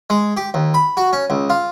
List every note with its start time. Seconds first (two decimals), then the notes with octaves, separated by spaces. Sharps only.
0.10 G#3
0.37 G4
0.54 D#2
0.74 B5
0.97 F#4
1.13 C#4
1.30 C#2
1.50 F4